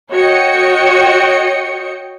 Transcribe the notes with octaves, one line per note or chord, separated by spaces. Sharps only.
F#4 C#5 D#5 G5 C#7